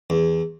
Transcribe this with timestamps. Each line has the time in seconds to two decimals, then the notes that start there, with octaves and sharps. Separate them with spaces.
0.10 E2